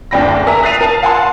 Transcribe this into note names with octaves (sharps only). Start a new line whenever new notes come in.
F#1 D2 D4 G5 B5 A#6
A#4 E5 G#5 A#5
D#6 F#6 A6 C7 D#7 F7
A#4 A5
F5 F#5 G#5 A5 C6